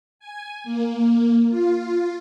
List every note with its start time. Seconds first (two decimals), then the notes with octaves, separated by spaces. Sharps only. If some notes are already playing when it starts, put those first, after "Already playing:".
0.19 G#5
0.64 A#3
1.49 F4